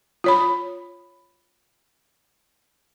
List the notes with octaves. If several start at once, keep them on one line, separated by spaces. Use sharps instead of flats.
F4 C#5 B5